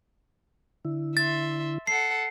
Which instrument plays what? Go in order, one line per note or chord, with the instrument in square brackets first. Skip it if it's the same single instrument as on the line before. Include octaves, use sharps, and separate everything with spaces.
[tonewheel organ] D3 E4
[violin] E5 C6 [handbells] A6
[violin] A4 F#5 [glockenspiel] C7